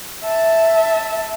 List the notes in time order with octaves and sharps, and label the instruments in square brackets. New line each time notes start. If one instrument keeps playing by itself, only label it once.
[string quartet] E5 A5